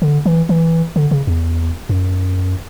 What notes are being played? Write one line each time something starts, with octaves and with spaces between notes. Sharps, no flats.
D3
E3
E3
D3
C#3
E2
F#2